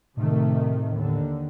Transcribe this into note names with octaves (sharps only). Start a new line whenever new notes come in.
A2 C3 D#3 A3
D#2 D3